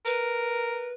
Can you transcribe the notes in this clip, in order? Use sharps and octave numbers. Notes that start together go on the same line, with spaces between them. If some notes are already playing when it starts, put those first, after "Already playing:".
A#4 B4